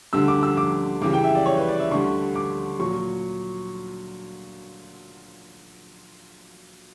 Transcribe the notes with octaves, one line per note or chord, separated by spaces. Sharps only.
D2 D3 G3 E6
D6
E6
D6
C#2 C#3 E3 G3 D6
G5
E5
D5
C#5
B4
D5
E5
D2 D3 G3 C#6
D6
A#2 F#3 C#6